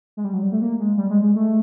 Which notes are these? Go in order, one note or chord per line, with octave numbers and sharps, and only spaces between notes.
G#3
G3
F#3
G3
A3
A#3
G#3
G3
G#3
G#3
A3